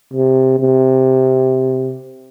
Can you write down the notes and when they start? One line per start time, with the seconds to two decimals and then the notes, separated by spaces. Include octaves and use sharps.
0.13 C3
0.59 C3